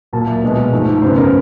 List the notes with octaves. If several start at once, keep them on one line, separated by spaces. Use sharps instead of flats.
A#2 F#3 A#3 A5
E5
B2 G#3 B3 D4
G#2 F3 A3
F#2 C#3 F#3 B3 D4 C5
A#4